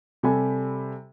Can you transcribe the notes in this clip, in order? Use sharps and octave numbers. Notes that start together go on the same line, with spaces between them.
C3 G3 A4 G#5 B5